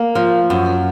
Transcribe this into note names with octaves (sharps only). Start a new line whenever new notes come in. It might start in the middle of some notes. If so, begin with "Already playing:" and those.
Already playing: A#3
F3
F#2